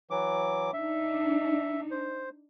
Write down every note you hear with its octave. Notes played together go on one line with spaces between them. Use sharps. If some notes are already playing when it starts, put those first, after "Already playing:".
E3 F#3 D6
D4 D#4 E5
C5